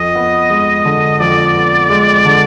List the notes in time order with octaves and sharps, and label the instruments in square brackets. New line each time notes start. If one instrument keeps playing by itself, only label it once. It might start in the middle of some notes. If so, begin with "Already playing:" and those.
Already playing: [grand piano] F2 [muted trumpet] D#5
[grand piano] B3
G#3
D3
[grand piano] F2 [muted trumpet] D5
[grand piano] B3
G#3
D3